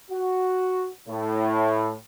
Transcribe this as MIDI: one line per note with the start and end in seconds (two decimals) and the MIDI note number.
0.11 0.89 66
1.08 1.94 45